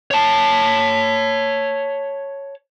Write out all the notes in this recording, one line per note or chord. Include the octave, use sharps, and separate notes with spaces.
C#5 A5